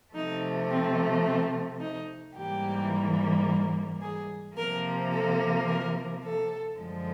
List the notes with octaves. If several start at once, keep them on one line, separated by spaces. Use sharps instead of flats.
C3 F3 A3 D#4
C4
C4
D#4
G#2 E3 G3 A#3 G4
G#4
C3 F3 A#3 A#4
A4
A#4
A4
F#2 D3 F3 G#3